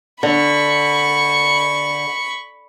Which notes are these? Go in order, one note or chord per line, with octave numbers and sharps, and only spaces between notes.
D3 B5 C#6